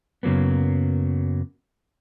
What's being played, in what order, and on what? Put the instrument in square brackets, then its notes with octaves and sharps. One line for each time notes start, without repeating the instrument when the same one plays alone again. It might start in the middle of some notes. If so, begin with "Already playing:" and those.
[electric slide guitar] F#2 C#3 F#3 A#3 B3